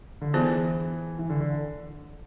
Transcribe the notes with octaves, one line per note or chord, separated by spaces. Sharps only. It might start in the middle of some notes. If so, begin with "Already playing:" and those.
D3
E3 B3 F4 G#4 C5
E3
D3
D3